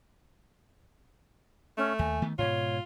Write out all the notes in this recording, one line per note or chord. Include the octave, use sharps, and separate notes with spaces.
A3 C#4
D#2 G#5
D#3 A3 B3
G#2 B2 F4 C#5